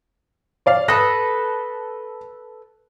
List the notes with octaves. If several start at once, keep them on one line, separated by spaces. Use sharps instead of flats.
C#5 D5 F5
A4 B4 D#6 F#6 A#6